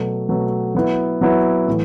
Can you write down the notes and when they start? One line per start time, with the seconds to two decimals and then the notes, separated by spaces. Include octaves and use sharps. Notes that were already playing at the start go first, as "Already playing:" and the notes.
Already playing: B2 F#3 A3
0.29 B2 F#3 A3
0.75 F#3 B3 E4
1.21 F#3 B3 E4
1.68 A2 E3